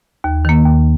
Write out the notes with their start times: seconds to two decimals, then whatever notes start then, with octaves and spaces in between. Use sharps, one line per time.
0.24 D#2
0.45 D#3 A#3
0.66 D#2